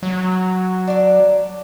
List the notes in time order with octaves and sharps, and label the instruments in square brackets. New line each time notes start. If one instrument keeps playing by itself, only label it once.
[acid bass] F#3
[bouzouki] D4 D5